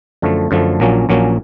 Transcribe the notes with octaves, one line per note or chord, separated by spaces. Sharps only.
F#2 D3 F3 A3
F#2 D3 F3 A3
A#1 A#2 F#3 A#3 C#4
A#1 A#2 F#3 A#3 C#4